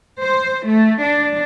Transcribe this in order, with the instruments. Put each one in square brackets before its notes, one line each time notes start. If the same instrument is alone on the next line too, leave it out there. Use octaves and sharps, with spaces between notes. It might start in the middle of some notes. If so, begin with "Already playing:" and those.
[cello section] C5
A3
D4